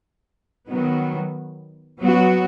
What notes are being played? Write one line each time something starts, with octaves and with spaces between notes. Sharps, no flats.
D#3 F#3 B3
F#3 B3 F#4